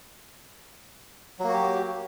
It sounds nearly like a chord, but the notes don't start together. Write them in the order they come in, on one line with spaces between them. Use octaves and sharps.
F#3 A#3 F#4 G4